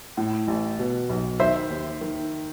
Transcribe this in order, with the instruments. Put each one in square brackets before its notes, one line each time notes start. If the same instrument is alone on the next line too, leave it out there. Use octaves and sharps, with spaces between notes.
[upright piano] A2
A1
B2
B1
[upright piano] D#3 [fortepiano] C5 E5
[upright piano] D#2
D#3